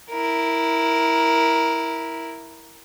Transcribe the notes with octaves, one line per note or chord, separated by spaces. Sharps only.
E4 A#4